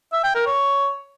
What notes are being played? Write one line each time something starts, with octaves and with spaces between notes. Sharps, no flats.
E5
G5
A#4
C#5